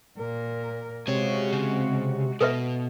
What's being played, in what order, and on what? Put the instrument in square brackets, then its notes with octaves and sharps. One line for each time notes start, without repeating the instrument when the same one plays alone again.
[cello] A#2 A#4
[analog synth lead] C3 [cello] G#3 F#4 [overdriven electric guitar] G#4 C#5
[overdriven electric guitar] C#3
[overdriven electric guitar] B2 [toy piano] A4 B4 E5